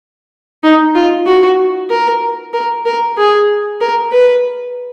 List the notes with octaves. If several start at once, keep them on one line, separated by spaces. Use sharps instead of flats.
D#4
F4
F#4
A#4
A#4
A#4
G#4
A#4
B4